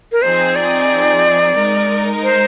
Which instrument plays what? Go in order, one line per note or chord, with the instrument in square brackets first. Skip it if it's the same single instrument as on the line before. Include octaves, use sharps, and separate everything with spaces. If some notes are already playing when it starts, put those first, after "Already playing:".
[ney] A#4
[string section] F3 C4 D#4 G#4 [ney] C5
[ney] D5
[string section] G#3 D#4 A#4
[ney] C5